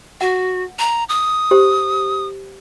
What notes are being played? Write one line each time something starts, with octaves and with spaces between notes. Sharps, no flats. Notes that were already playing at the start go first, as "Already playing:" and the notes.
F#4 F#5
A#5
D#6
G4 C5